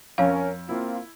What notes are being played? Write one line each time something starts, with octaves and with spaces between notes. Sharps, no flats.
F2 C#4 A#4 C#5 F5
A#3 C4 E4 F4